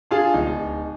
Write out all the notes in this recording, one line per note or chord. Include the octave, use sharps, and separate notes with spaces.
D4 F4 G#4
D1 D#4